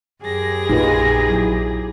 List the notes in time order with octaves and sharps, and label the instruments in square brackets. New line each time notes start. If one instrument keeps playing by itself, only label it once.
[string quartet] F#2 A#6 [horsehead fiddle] G4 G#4
[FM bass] A#1 [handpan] D#4 F4 B4
[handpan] F#3 E4